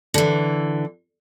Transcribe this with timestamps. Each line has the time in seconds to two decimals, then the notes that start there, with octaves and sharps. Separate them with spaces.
0.14 D3 E3